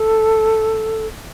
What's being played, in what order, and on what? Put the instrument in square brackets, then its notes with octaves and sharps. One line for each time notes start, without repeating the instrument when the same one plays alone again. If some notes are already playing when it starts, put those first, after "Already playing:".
Already playing: [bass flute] A4